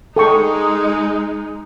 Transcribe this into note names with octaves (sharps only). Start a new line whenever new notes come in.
G#3 D#4 A4 G5 C#6